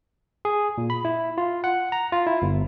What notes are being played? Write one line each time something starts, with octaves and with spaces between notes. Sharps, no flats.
G#4
A#2
B5
E4
F4
F#5
A#5
F4
E4
G1